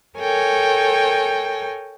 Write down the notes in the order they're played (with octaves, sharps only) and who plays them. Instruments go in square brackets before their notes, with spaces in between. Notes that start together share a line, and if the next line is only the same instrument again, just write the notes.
[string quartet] A4 A#4 C#5 G5 G#5